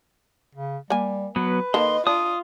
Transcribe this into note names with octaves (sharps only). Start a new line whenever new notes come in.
C#3
G3 A#3 G#5
F#3 B3 B4
D#3 A#3 A4 D#5 C6
D4 F4 D#6